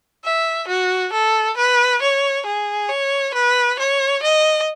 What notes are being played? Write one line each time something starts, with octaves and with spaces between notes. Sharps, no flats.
E5
F#4
A4
B4
C#5
G#4
C#5
B4
C#5
D#5